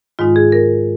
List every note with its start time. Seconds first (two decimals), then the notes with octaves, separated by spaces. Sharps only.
0.19 G#2 D#3 G#3 D#4 F4
0.36 G#4
0.52 A#4